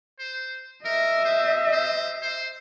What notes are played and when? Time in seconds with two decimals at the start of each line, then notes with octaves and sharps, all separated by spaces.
0.19 C5
0.85 A#4 D#5 E5
1.25 C5
1.72 C5
2.23 C5